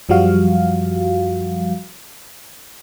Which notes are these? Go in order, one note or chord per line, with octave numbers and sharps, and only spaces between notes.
F#2 F3 G3 F#4 F5